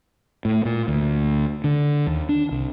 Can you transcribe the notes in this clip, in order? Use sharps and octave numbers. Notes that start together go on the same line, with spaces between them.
A2
A#2
D2
D3
D#2
D4
C2